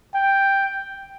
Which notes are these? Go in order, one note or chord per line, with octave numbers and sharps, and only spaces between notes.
G5